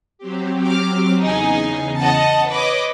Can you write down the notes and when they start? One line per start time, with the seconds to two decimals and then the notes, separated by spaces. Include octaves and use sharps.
0.18 F#3 C4 G4
0.66 D6 F6
1.22 E2 C#3 D#4 G#4 G#5
1.99 D#5 F#5 A5
2.49 B4 C#5 D#5 D6